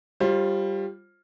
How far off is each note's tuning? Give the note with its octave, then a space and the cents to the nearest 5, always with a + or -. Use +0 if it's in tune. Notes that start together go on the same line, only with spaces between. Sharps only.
G3 +0 F4 +0 C5 +30